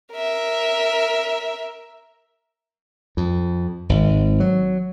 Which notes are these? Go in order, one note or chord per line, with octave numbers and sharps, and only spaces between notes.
A#4 E5
F2
G#1
F#3